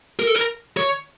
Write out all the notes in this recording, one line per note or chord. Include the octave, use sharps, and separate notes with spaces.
A#4
A4
A#4
C#5